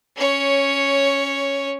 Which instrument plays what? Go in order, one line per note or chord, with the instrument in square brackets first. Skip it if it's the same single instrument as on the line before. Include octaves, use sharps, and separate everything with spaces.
[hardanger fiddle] C#4 C#5